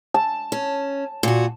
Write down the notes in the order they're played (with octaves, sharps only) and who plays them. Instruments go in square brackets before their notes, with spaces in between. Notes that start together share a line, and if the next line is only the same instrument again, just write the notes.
[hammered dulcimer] A5
[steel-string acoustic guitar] C#4
A#2 F#4